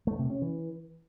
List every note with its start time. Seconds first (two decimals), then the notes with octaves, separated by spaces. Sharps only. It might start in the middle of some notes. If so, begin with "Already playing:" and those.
0.07 A3
0.19 C3
0.30 C#4
0.42 E3